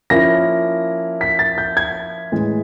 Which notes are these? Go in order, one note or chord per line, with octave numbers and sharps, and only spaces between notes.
F3 A#3 C#4 E4 A#6
B6
A6
G6
G#6
A2 E3 G#3